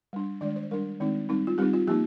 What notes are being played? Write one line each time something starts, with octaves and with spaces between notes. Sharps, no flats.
G3 D4
D#3 G#3 D4 D5
C5
G3 D4 A#4
D#3 G#3 C4 D#4
G3 C4 D#4
F4
G3 C4 D#4 G4
F4
F3 A#3 D#4 G4